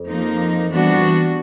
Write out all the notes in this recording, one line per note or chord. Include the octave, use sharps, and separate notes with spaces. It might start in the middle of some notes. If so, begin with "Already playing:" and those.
Already playing: F2
F3 A#3 D#4
E3 G3 B3 D4 F#4